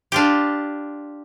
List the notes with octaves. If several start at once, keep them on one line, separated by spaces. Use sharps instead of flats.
D4 F4 G4